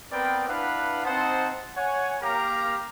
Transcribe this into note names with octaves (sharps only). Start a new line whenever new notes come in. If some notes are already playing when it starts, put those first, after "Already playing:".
B3 C4 A#4 B4 D5 G5
D4 E4 B4 F5 F#5
C4 D#4 C5 F#5 A5 D#6
C#5 F#5 G#5
A#3 G4 A#4 F5 A#5 D6